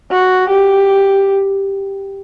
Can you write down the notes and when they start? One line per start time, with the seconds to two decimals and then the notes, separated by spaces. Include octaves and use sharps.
0.11 F#4
0.50 G4